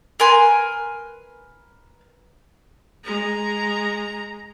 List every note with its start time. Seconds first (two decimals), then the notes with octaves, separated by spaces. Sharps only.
0.20 A#4 B4 G#5 C6
3.04 G#3 A#5